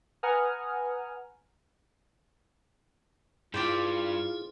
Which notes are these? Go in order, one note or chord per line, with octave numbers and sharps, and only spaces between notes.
B4 F#5 G#5 A#5 D#6 F6
G2 G3 E4 F4 G#4 C5 D5 G5